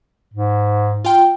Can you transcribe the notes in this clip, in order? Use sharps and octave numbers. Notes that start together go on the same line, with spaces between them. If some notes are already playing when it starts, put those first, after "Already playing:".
G#2
F4 G5